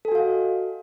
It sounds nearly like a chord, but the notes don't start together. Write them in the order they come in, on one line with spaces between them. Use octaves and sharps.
A4 G#5 F#4 F5 D#5